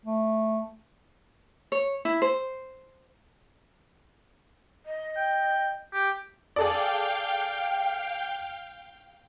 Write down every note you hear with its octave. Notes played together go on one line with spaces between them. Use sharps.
A3
C#5
E4
C5
D#5
G5
G4
G#4 A4 D5 F5 G5